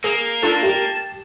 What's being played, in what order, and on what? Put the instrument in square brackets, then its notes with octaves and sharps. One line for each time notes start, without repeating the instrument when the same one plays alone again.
[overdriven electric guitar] A#3 [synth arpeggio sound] G#4
[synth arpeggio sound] D4 F4 A4 [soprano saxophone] A5
[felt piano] G4